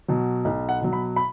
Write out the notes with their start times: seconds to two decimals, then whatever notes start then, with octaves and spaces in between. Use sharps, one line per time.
0.08 B2 F#3
0.45 B1
0.69 F#5
0.81 B2 F#3
0.93 B5
1.16 B5